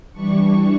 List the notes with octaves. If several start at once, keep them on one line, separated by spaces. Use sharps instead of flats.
E3 G3 D4 C#6